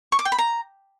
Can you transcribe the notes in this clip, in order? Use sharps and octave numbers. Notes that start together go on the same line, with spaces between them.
C#6
D6
G5
B5
A#5